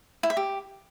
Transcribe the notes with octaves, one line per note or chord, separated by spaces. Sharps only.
E4
E5
G4